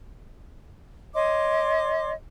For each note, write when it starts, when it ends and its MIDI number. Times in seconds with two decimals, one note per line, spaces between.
1.15 2.12 73
1.15 2.12 75
1.15 2.12 84
1.15 2.12 86